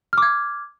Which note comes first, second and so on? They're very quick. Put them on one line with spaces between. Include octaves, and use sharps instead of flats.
F6 D6 G#6